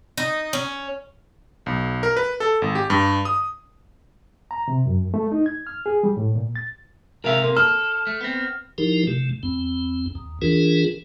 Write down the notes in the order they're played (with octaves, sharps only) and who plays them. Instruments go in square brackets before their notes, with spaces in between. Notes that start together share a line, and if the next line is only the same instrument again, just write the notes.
[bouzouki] D#4
C#4
[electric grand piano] B1
A#4
B4
A4
G#1
G4
G2
D#6
[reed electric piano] A#5
C3
F#2
A3
D#4
G#6
F6
G#4
G3
A2
A#2
A6
[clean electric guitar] G#2 C3 F5 [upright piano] A#4 E5
[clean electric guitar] C3 [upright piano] A#3
[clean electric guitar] A4 [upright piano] F6
[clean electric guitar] A3
B3 C4
[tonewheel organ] F3 D#4 E4 G4 A#4
C3 A3
E2 C4
D#2
E3 D4 F4 G#4 A#4